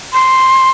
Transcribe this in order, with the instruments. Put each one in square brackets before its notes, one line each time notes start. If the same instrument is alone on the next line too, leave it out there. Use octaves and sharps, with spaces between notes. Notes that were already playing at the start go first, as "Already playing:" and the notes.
[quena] C6